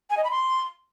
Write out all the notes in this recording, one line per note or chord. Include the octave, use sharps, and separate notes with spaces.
G#5
D#5
B5
C6